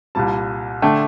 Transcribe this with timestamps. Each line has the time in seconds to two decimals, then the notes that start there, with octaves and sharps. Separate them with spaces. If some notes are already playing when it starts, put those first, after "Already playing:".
0.15 C2 A#2 G3 A5
0.82 D3 A3 D4 G5